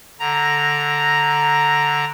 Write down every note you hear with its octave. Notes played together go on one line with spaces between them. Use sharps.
D3 A#5 A#6